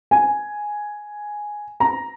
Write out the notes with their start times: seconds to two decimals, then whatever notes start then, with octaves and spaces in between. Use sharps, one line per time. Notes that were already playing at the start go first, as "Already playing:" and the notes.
0.11 G#5
1.80 A#5